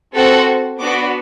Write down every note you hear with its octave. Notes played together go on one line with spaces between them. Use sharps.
C4 F#4 A4
B3 D4 F#4 D6